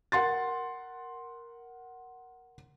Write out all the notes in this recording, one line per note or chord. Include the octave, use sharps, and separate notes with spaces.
A#4 F#5 C6 A6